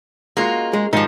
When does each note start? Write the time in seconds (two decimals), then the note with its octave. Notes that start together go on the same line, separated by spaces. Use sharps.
0.37 G#3 A#3 C#4 F4 F#4
0.73 G#3
0.93 G#2 D#3 F3 D#4 F4 G4